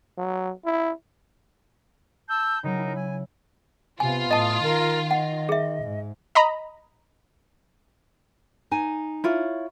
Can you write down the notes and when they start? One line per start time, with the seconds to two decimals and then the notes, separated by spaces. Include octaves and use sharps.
0.18 F#3
0.65 E4
2.28 A5 E6 G6
2.63 C#3 F#3 D#4 A#4
2.79 E4
2.96 E4 G#5
4.00 C3 B3 F4 G#5
4.31 A2 D#5 A5 D#6
4.63 D#3 A#4
5.11 D#5 F#5
5.49 G#4 E5
5.83 G#2
6.35 D#5 A#5 B5
8.71 D#4 G#5
9.24 E4 F4 C#5